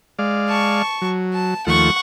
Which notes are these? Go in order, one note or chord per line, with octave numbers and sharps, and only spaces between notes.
G#3 D5 F5
A5 C#6
F#3
A5
D#2 F3 A3 F#5 C#6